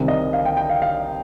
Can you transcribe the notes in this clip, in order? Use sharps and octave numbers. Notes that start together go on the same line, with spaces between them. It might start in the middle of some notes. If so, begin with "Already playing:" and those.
Already playing: C2 C3 D#3
D#5
F5
G5
G5
F5
F5